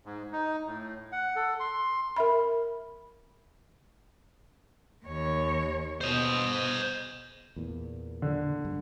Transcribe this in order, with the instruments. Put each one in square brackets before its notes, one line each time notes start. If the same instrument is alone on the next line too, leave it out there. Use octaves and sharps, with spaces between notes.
[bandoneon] G#2
D#4
A2
F#5
A4
C6
[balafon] A#4 E5 B5
[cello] D#2 C#5
[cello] B2 [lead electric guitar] C5 D#5
[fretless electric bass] E2 A#2
[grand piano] D3
[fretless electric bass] G2